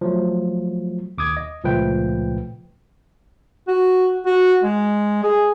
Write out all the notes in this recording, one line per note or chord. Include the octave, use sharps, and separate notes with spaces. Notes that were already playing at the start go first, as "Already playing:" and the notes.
F3 F#3 A3
D#2 D6 D#6 G#6
D#5
C#2 A#2 F3 A3 B4 G5
F#4
F#4
G#3
G#4